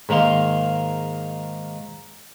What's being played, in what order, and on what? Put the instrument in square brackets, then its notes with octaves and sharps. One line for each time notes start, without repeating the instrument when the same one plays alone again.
[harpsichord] G#2 D#3 A#3 F5 C6